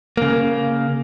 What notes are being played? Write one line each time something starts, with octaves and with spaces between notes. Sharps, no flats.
C#3 A#3